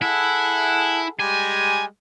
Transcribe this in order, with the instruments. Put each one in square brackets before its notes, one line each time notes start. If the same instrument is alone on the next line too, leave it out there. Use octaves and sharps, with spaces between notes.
[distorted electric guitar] E4 [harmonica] G#4 A4 F#5
[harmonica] G3 G#3 [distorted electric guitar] G#5